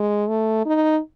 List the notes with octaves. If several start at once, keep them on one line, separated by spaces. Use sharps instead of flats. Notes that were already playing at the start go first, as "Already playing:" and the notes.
Already playing: G#3
A3
D#4